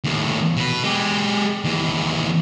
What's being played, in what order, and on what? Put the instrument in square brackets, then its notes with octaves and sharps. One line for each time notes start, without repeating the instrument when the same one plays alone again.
[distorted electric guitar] D#2 A2
B2 B4
G#3 G4
D#2 E3